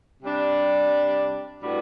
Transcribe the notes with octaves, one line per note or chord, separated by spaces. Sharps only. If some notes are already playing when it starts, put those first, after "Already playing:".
C3 G3 D4
A2 G3 B3 D4 F#4